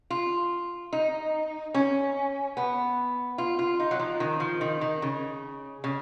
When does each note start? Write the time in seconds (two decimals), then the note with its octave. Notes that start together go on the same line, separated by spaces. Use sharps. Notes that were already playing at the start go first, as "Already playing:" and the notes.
0.10 F4
0.93 D#4
1.74 C#4
2.57 B3
3.38 F4
3.59 F4
3.80 D#4
3.91 F#3
3.99 F3
4.20 D#3
4.40 F3
4.61 D#3
4.81 D#3
5.02 C#3
5.84 C#3